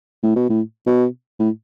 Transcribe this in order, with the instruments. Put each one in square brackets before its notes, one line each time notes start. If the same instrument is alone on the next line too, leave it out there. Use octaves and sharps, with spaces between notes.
[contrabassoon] A2
B2
A2
B2
A2